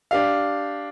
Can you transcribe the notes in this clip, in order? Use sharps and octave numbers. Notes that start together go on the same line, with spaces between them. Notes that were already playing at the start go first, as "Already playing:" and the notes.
D4 G4 F5